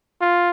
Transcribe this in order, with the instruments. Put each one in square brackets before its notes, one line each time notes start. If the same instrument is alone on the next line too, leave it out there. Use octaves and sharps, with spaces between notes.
[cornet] F4